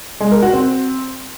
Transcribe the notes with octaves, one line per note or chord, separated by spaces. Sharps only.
G#3
A#4
F#4
C4